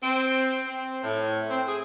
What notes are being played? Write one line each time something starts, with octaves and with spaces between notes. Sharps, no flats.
C4
C4
A2
C4
G#4